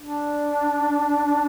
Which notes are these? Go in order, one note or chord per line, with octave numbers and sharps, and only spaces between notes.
D4